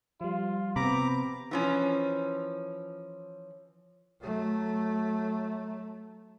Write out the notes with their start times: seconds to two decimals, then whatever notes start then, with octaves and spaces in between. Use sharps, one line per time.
0.21 F3 G3 F4
0.76 C3 B3 C4 A#5 B5 D6
1.51 E3 F3 C#4
4.20 F#3 A3